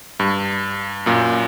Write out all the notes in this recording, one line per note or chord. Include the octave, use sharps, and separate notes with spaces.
G2
F#2 A#2